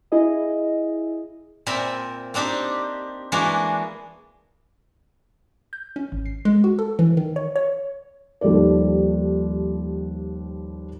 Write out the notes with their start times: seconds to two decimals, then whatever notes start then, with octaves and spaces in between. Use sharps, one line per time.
0.12 E4 G#4 D#5
1.66 A#2 C4 A#4 E5 B5
2.34 A#3 C4 D4 D#4 G4
3.32 E3 G#3 A#3 D4 F#4
5.73 G6
5.96 C#4
6.12 G#1
6.26 C7
6.45 G#3
6.64 F#4
6.79 A4
6.99 E3
7.17 D#3
7.36 C#5
7.56 C#5
8.41 D#2 F3 G3 A4 D5